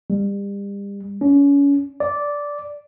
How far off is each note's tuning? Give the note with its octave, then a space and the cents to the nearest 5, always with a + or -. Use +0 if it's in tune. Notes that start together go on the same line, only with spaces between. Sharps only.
G3 +35
C#4 +30
D5 -10